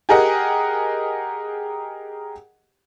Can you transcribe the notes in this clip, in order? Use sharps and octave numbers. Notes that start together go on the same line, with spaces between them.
G4 G#4 A#4 D#5 F#5